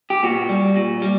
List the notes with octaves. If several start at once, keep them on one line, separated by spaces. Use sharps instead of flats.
G4
A#2 F#4
G3
A#2
G3